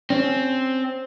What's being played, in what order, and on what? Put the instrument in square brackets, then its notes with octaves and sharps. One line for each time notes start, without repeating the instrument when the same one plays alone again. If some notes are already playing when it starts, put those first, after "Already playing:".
[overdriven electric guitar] C4 [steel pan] C#4